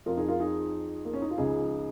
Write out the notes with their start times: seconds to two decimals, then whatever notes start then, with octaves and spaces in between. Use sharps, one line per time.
0.06 F2 F3 F4 A#4
0.17 D#4 G#4
0.28 F4 A#4
0.40 D#4 G#4
1.05 A#3
1.13 C#4
1.22 D#4
1.31 F4
1.38 C#2 C#3 F3 D#4 G#4